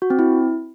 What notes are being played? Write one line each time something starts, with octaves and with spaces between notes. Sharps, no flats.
F#4
C4
E4